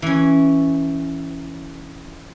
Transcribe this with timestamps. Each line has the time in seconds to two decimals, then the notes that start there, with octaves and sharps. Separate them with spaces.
0.02 E3 C#4